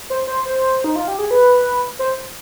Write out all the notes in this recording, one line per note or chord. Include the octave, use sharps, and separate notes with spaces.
C5
C5
C5
D#4
F4
G4
G#4
B4
C5